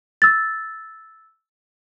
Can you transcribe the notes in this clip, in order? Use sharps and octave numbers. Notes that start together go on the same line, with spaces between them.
E6 A6